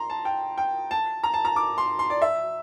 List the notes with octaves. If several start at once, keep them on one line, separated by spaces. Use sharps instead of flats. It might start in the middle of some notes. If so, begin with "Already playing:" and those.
Already playing: A#5 C6
A5
G5
G5
A5
A#5
A5
A#5
D6
C6
C6
D5
E5